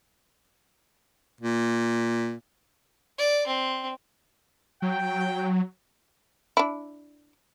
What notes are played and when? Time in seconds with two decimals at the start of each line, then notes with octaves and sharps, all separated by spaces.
1.41 A#2
3.18 D5
3.47 C4
4.82 F#3 G5
6.57 D4 E4